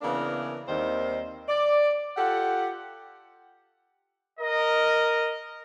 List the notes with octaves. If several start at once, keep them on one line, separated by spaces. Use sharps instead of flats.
C#3 E3 A#3 B3 D4 A#4
D#2 D#3 G3 C4 C5 D#5
D5
F4 G4 A4 F#5
A#4 D#5